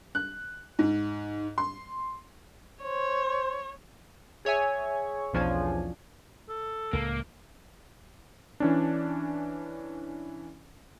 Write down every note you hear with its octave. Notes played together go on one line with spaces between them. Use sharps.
F#6
G#2
C6
C5 C#5
G#4 C#5 E5 G#5
B1 E2 F3 C#4 D4 G#5
A4
C#2 A2 A#3
E3 C#4 D4